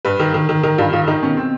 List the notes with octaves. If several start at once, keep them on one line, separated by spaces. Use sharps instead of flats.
G2 B4
D#3
D#3
D#3
D#3 A#4
G2 F4
D#3 F4
D#3 D#4
B2 C#4
B2 C4